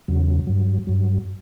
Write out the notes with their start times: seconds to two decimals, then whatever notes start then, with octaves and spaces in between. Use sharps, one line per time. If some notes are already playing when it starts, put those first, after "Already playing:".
0.08 E2 C#3 F#3
0.47 G2 F#3
0.87 G2 F#3